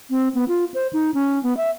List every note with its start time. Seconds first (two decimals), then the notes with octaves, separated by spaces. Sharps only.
0.10 C4
0.35 B3
0.48 F4
0.74 C5
0.93 D#4
1.14 C#4
1.43 B3
1.57 E5